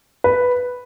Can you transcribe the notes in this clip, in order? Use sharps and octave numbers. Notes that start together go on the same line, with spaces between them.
B4